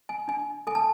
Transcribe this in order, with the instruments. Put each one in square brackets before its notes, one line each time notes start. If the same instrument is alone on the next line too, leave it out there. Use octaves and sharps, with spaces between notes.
[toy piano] G#5
D4 G#5
A4 G#5
A5